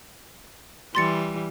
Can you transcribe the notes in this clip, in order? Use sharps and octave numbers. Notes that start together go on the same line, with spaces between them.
E3 G3 C6 A6 C#7